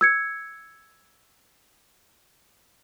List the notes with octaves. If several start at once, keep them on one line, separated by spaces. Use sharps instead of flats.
E6 G#6 C#7